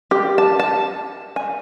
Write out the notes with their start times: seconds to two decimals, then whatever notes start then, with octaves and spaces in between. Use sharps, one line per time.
0.11 G4
0.38 A5
0.60 A5
1.36 G#5